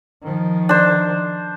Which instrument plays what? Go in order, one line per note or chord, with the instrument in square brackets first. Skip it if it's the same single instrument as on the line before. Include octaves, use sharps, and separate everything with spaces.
[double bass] D#3 F3
[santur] D4 C5